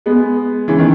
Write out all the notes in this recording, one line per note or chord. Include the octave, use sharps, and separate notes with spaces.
G#3 B3
C#3 E3
D#3